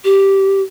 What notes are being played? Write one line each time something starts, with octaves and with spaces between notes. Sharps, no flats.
G4